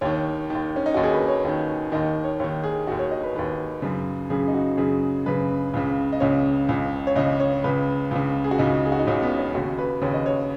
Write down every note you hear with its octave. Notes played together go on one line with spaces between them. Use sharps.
D#2 D#3 C#5
D#2 D#3
C#4
D#4
D#2 D#3 F#4
G#4
B4
C#5
D#2 D#3
D#2 D#3 D#5
C#5
D#2 D#3 C#5
G#4
D#2 D#3 F#4
C#5
D#5
B4
D#2 D#3 B4
F#2 C#3
F#2 C#3 G#4
D#4
F#4
F#2 C#3 G#4
F#2 C#3 B4
C#2 C#3
D#5
C#2 C#3 C#5
C#2 C#3
C#5
C#2 C#3 D#5
C#5
C#2 C#3 B4
C#2 C#3
G#4
F#4
C#2 C#3 D#4
G#4
F#4
D#4
C#2 C#3 C#4
B3
C#4
D#2 C#3 F#4
B4
D#2 C#3 C#5
D#5
C#5